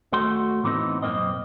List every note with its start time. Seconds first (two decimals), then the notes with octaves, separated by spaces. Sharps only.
0.12 D#2 A3 F#4 C6
0.64 A2 E3 B3 C4 D#4
1.02 B1 F#2 A#3 C4 D#5